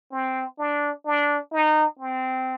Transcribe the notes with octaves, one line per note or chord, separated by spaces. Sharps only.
C4
D4
D4
D#4
C4